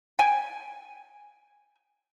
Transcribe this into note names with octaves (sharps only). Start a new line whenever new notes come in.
G5 G#5